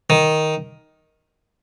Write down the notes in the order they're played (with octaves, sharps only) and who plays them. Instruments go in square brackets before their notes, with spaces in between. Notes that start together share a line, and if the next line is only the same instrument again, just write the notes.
[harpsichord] D#3